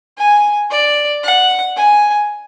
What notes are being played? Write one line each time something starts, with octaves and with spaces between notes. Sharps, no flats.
G#5
D5
F#5
G#5